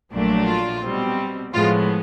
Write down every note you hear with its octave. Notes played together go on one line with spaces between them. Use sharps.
A#1 A#2 F#3 A3 D4
F4
B2 G3 C4
A2 F3 G#3 B3 F4